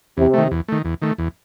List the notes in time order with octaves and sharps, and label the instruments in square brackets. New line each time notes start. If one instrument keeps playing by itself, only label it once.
[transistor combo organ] E2 [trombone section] C3
[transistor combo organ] D#3 A3
E2
D#3 A3
E2
D#3 A3
E2